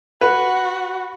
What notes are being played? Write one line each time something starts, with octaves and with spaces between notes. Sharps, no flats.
F#4 B4